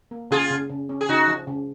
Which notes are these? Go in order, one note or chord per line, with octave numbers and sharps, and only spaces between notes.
A#3
C#3 F4 G#4
C#3
C#3
C#4
G#4
C#3 D#4 F#4
F3
C#3